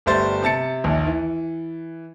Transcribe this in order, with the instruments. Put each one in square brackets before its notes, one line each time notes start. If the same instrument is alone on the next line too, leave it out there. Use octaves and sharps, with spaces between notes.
[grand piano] G1 G3 A3 C5 A6
C3 A5 A6 C#7
A#1 D#2
E3